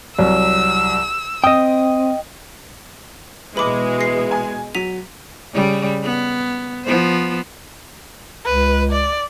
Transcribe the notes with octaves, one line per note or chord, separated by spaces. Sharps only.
C2 F#3 E6
C4 D#5 G5 D#6
B2 E3 G#3 B5 D6
A#6 C7
G#5
F#3 B6 D#7 F7
C#3 G3
B3
F3 B3 C5
C#2 B4
D5